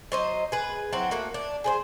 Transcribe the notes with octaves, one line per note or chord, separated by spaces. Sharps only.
F#3 C5 D#5
G#4 B4
F#3 C4 E4 F#5
A3 A#3 F#4
D4
G#4 B4 C5